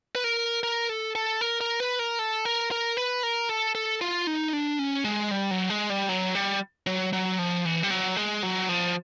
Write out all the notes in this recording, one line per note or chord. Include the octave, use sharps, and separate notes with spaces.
B4
A#4
A#4
A4
A4
A#4
A#4
B4
A#4
A4
A#4
A#4
B4
A#4
A4
A4
F4
D#4
D4
C#4
G#3
G3
F#3
G#3
G3
F#3
G3
F#3
F#3
F3
E3
G3
F#3
G#3
F#3
F3